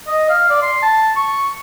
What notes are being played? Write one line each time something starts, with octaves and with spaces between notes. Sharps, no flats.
D#5
F5
D5
C6
A5
C#6